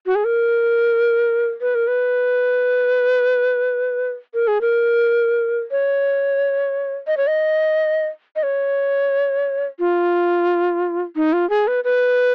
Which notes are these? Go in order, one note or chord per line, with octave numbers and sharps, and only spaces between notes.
F#4
G#4
A#4
B4
A#4
B4
A#4
G#4
A#4
C#5
D#5
C#5
D#5
D#5
C#5
F4
D#4
F4
G#4
B4
B4